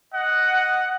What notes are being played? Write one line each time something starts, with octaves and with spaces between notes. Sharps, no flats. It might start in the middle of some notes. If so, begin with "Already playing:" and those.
D#5 F#5